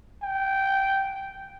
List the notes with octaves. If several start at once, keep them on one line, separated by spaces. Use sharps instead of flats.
G5